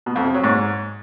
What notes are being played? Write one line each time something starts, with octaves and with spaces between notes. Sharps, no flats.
B2
F2
C3
F#3
G#2